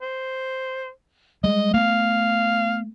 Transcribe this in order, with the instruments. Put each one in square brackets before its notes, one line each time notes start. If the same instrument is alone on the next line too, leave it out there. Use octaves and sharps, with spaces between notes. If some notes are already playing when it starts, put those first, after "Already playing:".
[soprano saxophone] C5
[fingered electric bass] G3 G#3 [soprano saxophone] D#5
[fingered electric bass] A3 B3 [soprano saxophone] F5